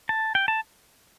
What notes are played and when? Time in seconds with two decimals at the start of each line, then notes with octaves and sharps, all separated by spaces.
0.09 A5
0.35 G5
0.48 A5